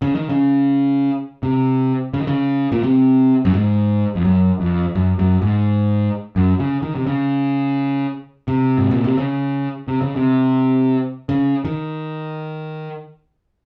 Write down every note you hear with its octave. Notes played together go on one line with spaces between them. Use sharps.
C#3
D#3
C#3
C3
C#3
D#3
C#3
A#2
C3
F#2
G#2
F2
F#2
F2
F#2
F#2
G#2
F#2
C#3
D#3
C3
C#3
C3
G#2
A#2
C3
C#3
C3
C#3
C3
C#3
D#3